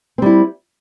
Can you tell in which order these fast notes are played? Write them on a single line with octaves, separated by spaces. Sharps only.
C4 G3 E4